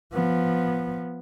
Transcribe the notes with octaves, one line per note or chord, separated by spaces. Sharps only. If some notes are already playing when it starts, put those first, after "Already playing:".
F3 B3